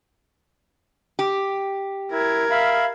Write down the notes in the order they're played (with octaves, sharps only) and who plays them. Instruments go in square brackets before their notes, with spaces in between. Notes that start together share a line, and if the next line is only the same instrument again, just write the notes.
[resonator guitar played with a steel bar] G4
[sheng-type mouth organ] E4 [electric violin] A#4 G#6
[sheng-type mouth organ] E5 F5 B5